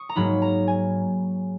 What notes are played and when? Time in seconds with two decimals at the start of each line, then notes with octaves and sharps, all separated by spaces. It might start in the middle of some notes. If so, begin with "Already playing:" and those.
Already playing: C#6 D#6
0.09 A#5
0.15 G#2 F#3 A#3 D#4 B5
0.42 A#5
0.68 G#5